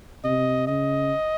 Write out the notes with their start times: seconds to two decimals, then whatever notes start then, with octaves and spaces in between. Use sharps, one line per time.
0.24 C3 D#5
0.67 C#3 D#5